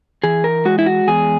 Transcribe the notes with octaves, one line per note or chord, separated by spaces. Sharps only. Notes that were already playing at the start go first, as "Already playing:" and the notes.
E3 G#4
A#4
G#3 F#4
E4
F#4
E2 G#4